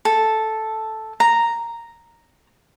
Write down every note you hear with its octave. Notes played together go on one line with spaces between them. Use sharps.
A4
A#5